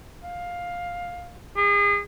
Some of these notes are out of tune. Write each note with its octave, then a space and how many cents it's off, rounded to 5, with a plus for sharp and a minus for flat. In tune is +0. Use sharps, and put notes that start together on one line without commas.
F5 +10
G#4 -35